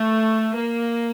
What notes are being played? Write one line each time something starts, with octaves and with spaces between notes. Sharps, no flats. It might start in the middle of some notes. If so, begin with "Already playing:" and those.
Already playing: A3
A#3